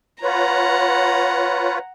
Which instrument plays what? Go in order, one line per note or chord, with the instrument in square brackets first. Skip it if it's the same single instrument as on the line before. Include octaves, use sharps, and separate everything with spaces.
[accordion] F4 B4 C#5 [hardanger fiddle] F#5 A#5